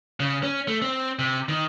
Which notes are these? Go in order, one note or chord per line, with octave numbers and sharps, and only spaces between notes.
C#3
C#4
A3
C4
C3
D#3